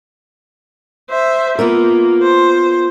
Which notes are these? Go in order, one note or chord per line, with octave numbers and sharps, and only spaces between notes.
C5 E5
A#3 B3 F4 A#4
C5